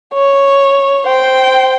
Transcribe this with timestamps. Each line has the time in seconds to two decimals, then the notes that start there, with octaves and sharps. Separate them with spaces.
0.14 C#5
1.07 C5 G5